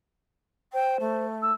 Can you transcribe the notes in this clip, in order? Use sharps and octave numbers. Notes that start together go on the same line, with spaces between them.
C5 G5
A3
E6